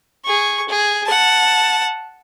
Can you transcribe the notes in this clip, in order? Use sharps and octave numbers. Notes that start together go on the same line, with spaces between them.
G#4 C#6
G#4
F#5 A5